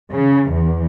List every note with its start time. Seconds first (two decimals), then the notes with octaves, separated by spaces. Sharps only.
0.13 C#3
0.51 E2